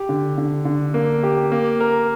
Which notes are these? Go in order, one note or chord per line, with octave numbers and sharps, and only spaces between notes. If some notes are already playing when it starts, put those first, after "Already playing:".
Already playing: G4
D3
D3
D3
A#3
G4
A#3
A#4